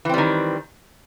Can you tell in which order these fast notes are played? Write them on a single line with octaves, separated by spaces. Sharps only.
E3 C4 G3 D#3